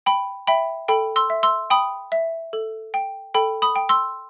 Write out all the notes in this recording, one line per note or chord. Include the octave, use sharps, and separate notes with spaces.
G5 B5
E5 G5 B5
A4 G5 B5
C6 E6
E5
C6 E6
G5 B5 D#6
E5
A4
G5
A4 G5 B5
B5 D#6
G5
C6 E6